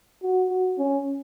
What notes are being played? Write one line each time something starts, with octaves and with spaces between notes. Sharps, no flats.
F#4
F#4
C#4